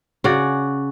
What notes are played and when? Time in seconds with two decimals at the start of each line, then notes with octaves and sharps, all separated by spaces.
0.24 C#3 F#4 D5